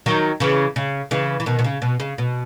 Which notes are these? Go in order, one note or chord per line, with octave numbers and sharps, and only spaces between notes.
D#3 F#3
C#3 E3
C#3
C#3 E3
E3
B2 D#3
B2
C#3
B2
C#3
B2